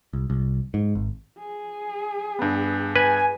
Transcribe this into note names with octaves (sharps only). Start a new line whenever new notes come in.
C2
C2
G#2
G#1
G#4
G2 B3
B4 G#5